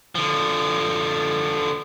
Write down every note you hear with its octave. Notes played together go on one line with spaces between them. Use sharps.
D3 F3